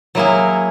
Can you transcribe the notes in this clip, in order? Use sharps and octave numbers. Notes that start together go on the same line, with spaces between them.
F#3 A#3 E4 G#4